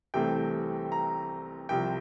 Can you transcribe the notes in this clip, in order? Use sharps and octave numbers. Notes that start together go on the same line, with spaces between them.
C2 C3 E3 A3 C4 G5
A#5
C2 C3 F3 G5